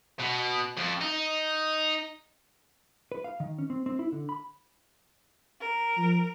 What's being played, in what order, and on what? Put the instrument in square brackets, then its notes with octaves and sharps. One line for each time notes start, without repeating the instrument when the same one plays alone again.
[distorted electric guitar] B2
F2
D#4
[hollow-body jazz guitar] B4
F5
D#3
C#4
C4
C4
E4
D3
B5
[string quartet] A#4
[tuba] F3